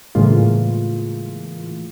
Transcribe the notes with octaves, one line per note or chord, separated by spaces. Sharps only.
A2 C#3 E3 G#3 A#3 F4